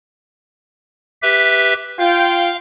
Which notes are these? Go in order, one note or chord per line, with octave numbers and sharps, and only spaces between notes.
G4 B4 E5
F4 F5 G5